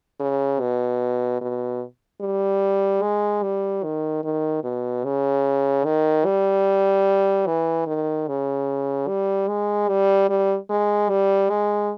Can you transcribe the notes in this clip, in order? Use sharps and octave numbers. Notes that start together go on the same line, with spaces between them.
C#3
B2
B2
G3
G#3
G3
D#3
D#3
B2
C#3
D#3
G3
E3
D#3
C#3
G3
G#3
G3
G3
G#3
G3
G#3